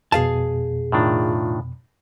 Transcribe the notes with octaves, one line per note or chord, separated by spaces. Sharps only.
F2 B2 G#4 F5 A5
A2 D#3 D4 F4